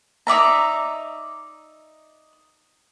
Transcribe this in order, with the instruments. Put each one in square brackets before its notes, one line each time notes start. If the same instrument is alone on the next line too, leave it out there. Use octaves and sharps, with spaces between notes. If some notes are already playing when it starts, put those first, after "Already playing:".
[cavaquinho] D#4 D5 E5 A#5